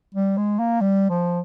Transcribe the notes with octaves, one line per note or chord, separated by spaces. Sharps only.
G3
G#3
A#3
G3
F3